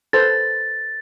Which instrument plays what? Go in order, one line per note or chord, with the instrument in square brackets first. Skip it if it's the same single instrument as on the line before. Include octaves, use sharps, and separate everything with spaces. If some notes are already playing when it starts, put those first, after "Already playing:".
[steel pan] A4 B4 C5 [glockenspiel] A6